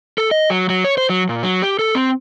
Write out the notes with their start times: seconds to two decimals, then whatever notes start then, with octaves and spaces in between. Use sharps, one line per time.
0.18 A4
0.31 D#5
0.50 F#3
0.70 F#3
0.84 C#5
0.98 C5
1.10 F#3
1.29 A#2
1.43 F#3
1.62 G4
1.79 A4
1.95 C4